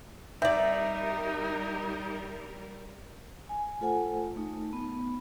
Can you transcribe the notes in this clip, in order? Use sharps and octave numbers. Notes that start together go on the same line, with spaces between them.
G3 C4 D#4 A#4 D5 E5
G#5
A3 F4 A4 C5 F#5 G#5
A3 D#4
B3